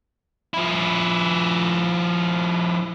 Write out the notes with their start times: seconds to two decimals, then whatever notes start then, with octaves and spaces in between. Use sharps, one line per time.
0.54 F3 E4